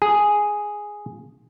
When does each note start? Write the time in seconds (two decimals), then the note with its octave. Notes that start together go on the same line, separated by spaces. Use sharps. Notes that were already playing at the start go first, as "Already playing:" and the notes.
0.02 G#4